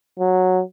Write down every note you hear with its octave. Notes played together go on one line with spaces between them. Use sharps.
F#3